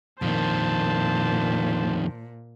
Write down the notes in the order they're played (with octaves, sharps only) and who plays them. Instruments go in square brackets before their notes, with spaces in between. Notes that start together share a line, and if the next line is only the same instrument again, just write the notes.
[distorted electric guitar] F2 D#3 [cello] A#2 [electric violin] C5 A5